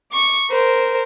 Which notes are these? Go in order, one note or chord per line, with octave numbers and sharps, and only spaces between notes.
C#6 D6
A#4 C5